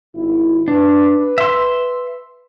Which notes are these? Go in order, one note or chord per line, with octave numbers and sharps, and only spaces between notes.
G#1 E4
D4 B4
E5 C6